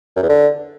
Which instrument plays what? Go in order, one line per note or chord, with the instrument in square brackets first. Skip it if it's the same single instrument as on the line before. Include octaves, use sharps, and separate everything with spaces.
[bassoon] F#2
E2
D3